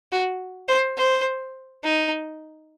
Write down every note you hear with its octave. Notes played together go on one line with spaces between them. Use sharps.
F#4
C5
C5
D#4